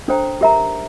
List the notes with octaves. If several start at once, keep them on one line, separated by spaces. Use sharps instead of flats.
D4 A4 C5 G5 A#5
G4 A#4 E5 A#5